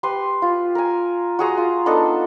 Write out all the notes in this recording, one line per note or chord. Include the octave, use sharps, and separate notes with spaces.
G4 B4 C6
F4
A#4 G#5
F#4 G#4 A#5 C6
F4
B3 D4 D#4 A4